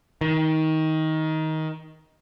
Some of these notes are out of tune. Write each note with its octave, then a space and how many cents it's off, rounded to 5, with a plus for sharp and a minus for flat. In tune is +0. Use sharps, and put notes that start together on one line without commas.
D#3 +20